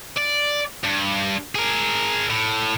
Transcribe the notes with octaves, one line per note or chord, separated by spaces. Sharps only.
D5
G2
G#4 A#4
A2